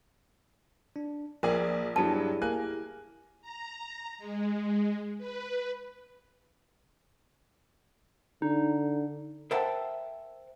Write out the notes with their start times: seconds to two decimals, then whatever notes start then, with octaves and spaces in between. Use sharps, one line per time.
0.96 D4
1.43 A#1 F3 G#4 A#4 D5 G#5
1.96 G2 F#3 B3 E4 G4 G#4 A5
2.42 A#3 G#5 F#6
3.42 A#5
4.18 G#3
5.18 B4
8.42 D3 D#4
9.51 A#4 C5 E5 F#5 G5 A5